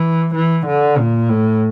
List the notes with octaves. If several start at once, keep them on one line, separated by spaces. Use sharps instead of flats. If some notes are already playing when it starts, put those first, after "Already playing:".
Already playing: E3
E3
D3
A#2
A2